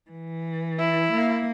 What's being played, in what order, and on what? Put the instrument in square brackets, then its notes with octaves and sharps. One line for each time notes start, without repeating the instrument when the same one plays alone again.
[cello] E3
[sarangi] E4
[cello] A#3